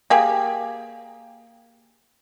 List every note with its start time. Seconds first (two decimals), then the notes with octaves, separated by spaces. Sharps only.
0.10 A#3 G4 G#4